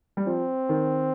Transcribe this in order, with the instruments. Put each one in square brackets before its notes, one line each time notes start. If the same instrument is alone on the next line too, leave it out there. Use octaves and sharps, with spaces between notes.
[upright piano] G3
[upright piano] F3 [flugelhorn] C4
[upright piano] D#3